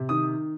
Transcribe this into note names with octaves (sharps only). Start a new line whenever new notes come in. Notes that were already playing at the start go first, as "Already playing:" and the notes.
Already playing: C3
D#3 D#6